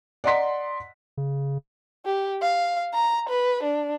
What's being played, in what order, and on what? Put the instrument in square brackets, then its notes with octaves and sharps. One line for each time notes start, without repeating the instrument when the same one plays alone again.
[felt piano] D5 D#5 F#5 A#5 C6 B6
[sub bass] C#3
[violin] G4
F5
A#5
B4
D4